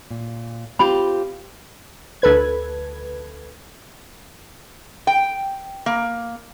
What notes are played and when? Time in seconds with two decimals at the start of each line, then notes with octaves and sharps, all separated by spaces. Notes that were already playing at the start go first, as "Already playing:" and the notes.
0.11 A#2
0.79 C4 F4 G4 B5
2.22 D2 A4 B4 G#6
5.07 G5
5.86 A#3